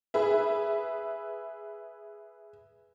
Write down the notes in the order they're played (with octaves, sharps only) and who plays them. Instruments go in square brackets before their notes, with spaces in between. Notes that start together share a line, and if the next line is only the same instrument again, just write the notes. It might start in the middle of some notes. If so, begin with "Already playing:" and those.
[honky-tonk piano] G#4 B4 E5